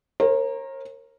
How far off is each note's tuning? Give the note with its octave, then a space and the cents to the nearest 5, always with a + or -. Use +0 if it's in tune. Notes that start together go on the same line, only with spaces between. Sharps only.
A#4 +0 C#5 -45